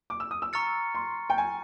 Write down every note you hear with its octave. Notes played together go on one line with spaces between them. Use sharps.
D6
E6
D#6
E6
A#5 C#6 F6 A6 C#7
C6
G5
G#5